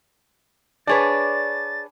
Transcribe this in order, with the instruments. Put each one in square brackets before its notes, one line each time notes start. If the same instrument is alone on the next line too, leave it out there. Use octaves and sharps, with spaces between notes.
[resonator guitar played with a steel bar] D4 G#4 B4 [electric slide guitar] C#5 D5 [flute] A6